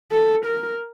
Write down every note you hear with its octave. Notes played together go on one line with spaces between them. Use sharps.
A4
A#4